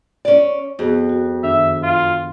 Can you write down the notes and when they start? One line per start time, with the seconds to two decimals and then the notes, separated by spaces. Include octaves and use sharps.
0.25 C#4 D5
0.79 F2 B3 F#4 G#4
1.09 F#4
1.44 F#2 D#3 D4 E5
1.83 F4